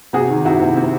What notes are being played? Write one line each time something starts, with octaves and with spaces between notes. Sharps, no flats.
C3 F#4 G#4
D#3
C3 E4 F#4
C3
C3